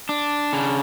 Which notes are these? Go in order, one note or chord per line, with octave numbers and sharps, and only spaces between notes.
D4
C#3